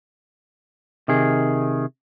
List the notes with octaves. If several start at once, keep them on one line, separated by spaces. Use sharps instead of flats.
C3 D#3 G#4